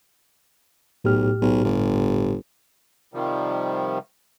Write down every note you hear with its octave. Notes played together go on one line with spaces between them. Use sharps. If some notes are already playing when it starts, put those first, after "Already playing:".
B1 A2 G4 F6
B1
G1
C3 D#3 F3 G3